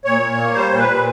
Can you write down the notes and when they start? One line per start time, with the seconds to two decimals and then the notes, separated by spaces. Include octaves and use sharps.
0.05 A#2 C#5
0.22 A#2
0.38 A#3
0.54 G3 C5
0.71 A#2
0.79 B4
0.88 A#2